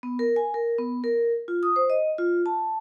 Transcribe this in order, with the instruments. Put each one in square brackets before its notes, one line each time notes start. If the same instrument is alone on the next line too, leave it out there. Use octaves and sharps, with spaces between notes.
[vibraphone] B3
A#4
G#5
A#4
B3
A#4
F4
D#6
C5
D#5
F4
A5